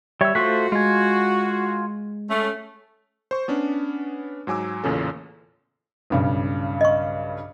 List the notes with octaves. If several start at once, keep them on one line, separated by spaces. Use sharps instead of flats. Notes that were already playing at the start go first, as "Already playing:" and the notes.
G3 C#5 E5 E6
A3 F4 F#4 C5 C#6 F#6 B6
G#3 F4 G#5
A3 C#4
C5 C#6
B3 C#4 D4
G#2 F#3 G#5 D6 E6
A1 E2 A#2 C#3 C#4 A4
B1 G2 C#3
D#5 C#6